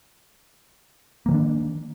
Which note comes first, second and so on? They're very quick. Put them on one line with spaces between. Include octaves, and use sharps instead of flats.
A#3 F3 D#3 D4